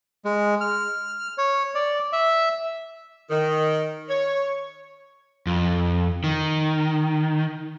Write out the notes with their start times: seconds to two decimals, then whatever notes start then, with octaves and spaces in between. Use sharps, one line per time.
0.25 G#3
0.61 F6
1.38 C#5
1.75 D5
2.13 E5
3.30 D#3
4.09 C#5
5.47 F2
6.24 D#3